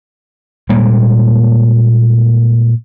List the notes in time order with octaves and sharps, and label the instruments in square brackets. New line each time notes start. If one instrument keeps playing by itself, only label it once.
[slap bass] A#2 G3 G#3 A#3